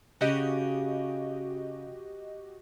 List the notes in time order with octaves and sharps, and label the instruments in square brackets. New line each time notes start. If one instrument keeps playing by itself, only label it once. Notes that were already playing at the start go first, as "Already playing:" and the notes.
[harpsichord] C#3 [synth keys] F#4 G4 D#5